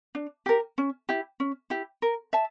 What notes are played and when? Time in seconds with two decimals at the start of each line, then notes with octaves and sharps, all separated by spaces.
0.15 D4
0.46 G4 A#4
0.78 C#4
1.09 E4 G4
1.40 C#4
1.70 E4 G4
2.02 A#4
2.33 E5 A5